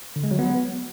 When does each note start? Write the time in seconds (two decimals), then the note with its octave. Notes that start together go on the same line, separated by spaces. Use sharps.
0.16 D3
0.24 G#3
0.31 F#3
0.39 B3